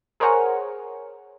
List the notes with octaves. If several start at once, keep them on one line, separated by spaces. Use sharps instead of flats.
G#4 A#4 C5 C#5 F#5 G#5